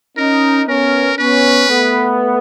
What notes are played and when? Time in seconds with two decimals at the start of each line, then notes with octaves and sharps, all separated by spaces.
0.17 C#4 D#4 A#4
0.68 B3 C#4 A#4
1.18 B3 C#4 B4
1.68 A3 B3